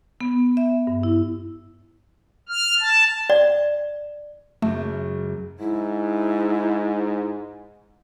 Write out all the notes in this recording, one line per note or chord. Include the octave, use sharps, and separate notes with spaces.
B3
E5
G2
E4
F6
A5
D5
C#2 F#2 A3
G#2 E4